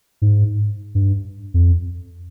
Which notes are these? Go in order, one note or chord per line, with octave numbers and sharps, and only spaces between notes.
G#2
G2
F2